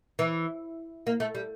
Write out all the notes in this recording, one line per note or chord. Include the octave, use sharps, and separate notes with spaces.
E3
A#3
A3
G3